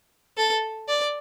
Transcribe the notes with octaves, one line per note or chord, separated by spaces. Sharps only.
A4
D5